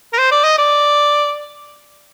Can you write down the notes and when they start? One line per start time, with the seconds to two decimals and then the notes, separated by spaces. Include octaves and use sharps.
0.13 A#4
0.18 C5
0.31 D5
0.44 D#5
0.58 D5